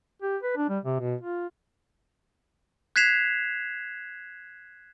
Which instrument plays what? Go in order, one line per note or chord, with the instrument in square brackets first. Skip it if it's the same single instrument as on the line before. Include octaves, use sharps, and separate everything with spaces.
[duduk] G4
B4
D4
G3
C3
B2
F4
[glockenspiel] F#6 G#6 B6 C7 E7 F7